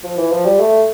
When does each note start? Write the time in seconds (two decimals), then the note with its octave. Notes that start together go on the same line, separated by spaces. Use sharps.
0.04 F3
0.17 E3
0.32 F3
0.45 G3
0.59 A3